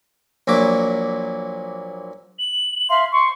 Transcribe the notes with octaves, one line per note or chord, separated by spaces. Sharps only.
A#1 A#2 F#3 E4 D6
F#7
E5 F5 C6
C6 C#6